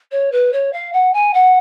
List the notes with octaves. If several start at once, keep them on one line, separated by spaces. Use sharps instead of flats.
C#5
B4
C#5
F5
F#5
G#5
F#5